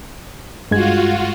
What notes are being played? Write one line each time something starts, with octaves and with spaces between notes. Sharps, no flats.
G2 G#3 F4 F#4 G#6